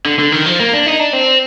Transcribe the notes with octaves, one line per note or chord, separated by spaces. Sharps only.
D3
D3
D#3
F3
A#3
D4
D#4
D4
C4